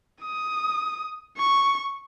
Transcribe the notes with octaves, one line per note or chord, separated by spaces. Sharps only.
D#6
C#6